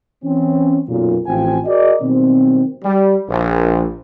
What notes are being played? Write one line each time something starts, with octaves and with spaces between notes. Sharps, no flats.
E3 C4 C#4
B1 F#2 A#2
A1 F3 C4 F4 G5 G#5
F#4 G#4 A#4 D5 D#5
B2 D#3 F#3 G3 C4
G3
A#1